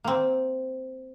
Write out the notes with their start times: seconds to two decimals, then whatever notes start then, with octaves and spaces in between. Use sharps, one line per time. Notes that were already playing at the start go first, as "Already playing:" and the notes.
0.04 A#3 C4